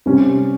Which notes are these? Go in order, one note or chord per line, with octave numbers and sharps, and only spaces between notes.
C3 G3 C#4